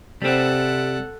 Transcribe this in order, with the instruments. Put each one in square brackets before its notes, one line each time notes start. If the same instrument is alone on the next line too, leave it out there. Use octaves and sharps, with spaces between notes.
[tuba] C3 [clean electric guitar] G3 C4 [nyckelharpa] A4 F#5